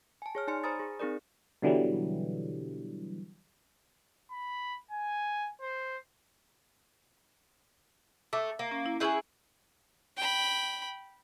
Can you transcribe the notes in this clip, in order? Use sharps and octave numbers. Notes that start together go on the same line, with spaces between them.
G#5 A5
G#4 C#5 F6
D#4 D5 G#5 C6 C#7
C5 G#5 A#5 B5 D#6 A6
G#4
C4 D#4 G#4 A#4 D5
B2 D3 E3 F#3 G3
B5
G#5
C5
A3 E5 D6 E6
A#3
C#4
E4
E4 G#4 B4 G#5 C#6 G6
G5 B5